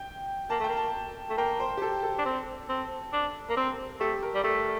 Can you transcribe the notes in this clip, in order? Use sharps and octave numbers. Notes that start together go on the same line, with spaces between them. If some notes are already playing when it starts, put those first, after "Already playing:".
Already playing: G5
A#3 A5
A3 G5
A#3
A5
A3
A#3 G5
C5
G4
A4
A4
D4
C4
C4
D4
A#3
C4
A3 G4
A#4
G3
A3 G4